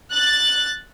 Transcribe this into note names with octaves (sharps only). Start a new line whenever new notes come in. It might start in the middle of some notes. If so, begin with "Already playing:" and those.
F#6 A6